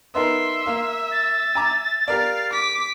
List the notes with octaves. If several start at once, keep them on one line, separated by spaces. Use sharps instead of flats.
B3 D#4 A#4 E5 C6
A#3 F5
A6
G#5 A#5 D6
G4 A#4 D5 F5
D6 B6